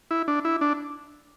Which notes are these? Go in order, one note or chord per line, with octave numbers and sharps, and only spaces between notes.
E4
D4
E4
D4